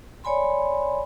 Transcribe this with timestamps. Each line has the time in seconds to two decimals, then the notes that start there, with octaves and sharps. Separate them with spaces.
0.24 C#5 D5 G#5 B5 C6